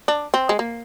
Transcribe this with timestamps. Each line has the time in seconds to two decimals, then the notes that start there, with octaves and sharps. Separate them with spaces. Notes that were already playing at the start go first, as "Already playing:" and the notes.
0.08 D4
0.34 C4
0.49 G#3
0.59 A#3